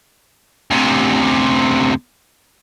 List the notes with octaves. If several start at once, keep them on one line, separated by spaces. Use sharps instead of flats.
D2 C3